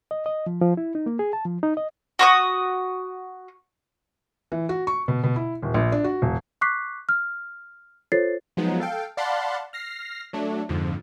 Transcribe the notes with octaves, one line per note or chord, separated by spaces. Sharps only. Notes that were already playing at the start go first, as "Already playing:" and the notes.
D#5
D#5
F3
F3
E4
D#4
A#3
G#4
A5
F3
D#4
D#5
F#4 C#6 D#6
E3
F#4
C#6
B2
B2
E4
D#1
A#1
D4
F#4
E1
C#6 D6 F#6 B6 C7
F6
F4 A4 C5 C#5 A6 C7
F3 F#3 G#3 B3 D#4
A4 F5 G5
D5 F5 F#5 A5 B5 C6
F6 A#6 C7
F#3 A3 D4
F2 G#2 D3 F3